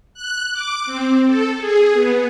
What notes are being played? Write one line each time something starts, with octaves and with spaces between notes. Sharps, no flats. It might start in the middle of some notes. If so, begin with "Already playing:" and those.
F#6
D6
C4
A4
G#4
B3